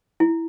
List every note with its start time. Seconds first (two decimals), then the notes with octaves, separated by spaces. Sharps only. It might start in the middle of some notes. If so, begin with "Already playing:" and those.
0.20 E4